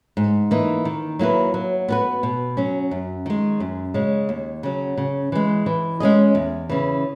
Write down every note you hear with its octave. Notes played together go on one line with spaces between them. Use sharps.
G#2
E3 A#3 D#4
D#3
F#3 A#3 E4 B4
F#3
B3 F#4 B4
B2
F#3 C#4
F#2
D#3 G#3
F#2
C#3 G#3 C#4
D#2
C#3 F#3
C#3
E3 G#3
E3
G#3 C#4 G#4 D#5
E2
C#3 E3